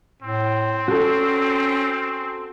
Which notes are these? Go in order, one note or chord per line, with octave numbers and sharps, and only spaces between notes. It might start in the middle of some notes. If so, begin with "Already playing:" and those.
A2 C4
C#4 F#4 A4